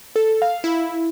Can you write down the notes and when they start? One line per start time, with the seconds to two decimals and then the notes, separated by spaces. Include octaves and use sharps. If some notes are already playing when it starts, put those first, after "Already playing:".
0.16 A4
0.42 F5
0.64 E4